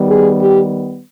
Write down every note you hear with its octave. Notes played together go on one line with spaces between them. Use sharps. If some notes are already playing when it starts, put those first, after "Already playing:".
Already playing: D#3 G3 B3
G#4
G4